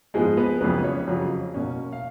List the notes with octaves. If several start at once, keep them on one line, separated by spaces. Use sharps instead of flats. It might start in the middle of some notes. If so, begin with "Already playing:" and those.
G#2 F3 G#3 B3 G#4
B3 B4
F2 C#3 F#3 B3 B4
C#4 C#5
F2 C#3 F#3
B2 A#3 C#4
F5